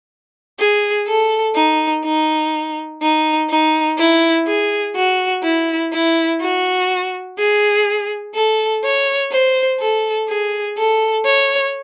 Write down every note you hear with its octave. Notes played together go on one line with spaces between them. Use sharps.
G#4
A4
D#4
D#4
D#4
D#4
E4
G#4
F#4
E4
E4
F#4
G#4
A4
C#5
C5
A4
G#4
A4
C#5